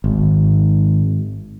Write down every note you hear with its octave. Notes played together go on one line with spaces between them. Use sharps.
G#1